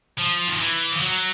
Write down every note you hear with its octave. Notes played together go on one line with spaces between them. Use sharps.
F3
D#3
E3
F3
F#3